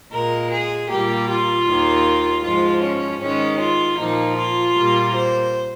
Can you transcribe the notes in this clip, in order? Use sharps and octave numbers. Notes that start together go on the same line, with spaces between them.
A#2 G#3 A#4
G#4
A#2 G3 A#3 G4
F4
D#2 D#3 A#3
G#2 F3 G#3 F4
C#4
G#2 D#3 G#3 C#4
F4
A#2 F3 A#3 D#4
F4
A#2 G3 A#3
C5